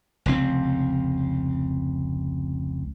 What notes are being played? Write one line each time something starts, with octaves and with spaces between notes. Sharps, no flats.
F1 C#2 C4